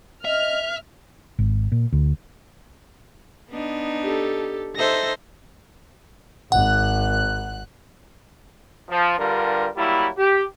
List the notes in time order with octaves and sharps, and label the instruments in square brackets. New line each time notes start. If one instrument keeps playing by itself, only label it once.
[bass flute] D#5 [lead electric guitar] E5 [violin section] F6
[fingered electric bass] G#1
A#2
D2
[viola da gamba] B3 D4 D#4
[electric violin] G4 A4
[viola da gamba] D#4 A4 C5 [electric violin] E5 A#6
[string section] G#1 F#6 [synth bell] F#5
[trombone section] F3
G2 D3 G3 F4 A#4
F#3 G3 A#3 E4
G4